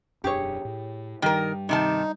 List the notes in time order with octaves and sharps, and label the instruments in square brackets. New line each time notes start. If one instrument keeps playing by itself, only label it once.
[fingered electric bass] E1 F#2 D4 [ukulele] G4 G#4 C#5
[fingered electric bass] A2
[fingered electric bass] G2 G3 [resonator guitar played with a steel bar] D#3 A#4 [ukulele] G4
[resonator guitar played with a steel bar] C3 D#3 A5 [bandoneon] D#4